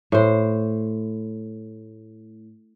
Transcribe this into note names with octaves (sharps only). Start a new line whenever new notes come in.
A2 C5